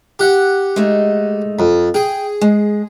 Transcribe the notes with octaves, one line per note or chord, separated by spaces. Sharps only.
G4 F#5
G#3 A3 D#4
F2
G#4 G5
G#3